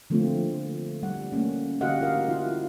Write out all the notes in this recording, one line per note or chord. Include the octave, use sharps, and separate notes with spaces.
D3 F3 A3 A#3 C4 F4
G3 F#5
A3 A#3 C#4
D3 F#4 G4 D#5 F5 F#5
F4 A#4 F5
E4 F4